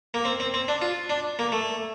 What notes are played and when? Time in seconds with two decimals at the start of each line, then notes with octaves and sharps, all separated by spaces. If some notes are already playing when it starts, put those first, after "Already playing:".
0.14 A#3
0.25 C4
0.40 C4
0.54 C4
0.68 D4
0.82 F4
1.10 D4
1.39 A#3
1.52 A3